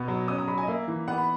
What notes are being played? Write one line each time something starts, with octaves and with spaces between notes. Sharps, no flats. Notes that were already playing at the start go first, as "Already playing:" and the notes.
Already playing: B2 B3
F#3
C#4 D#6
A#5
F#3 B5
G#5
D#5
A#3 E5
E3
B3 F#5
B5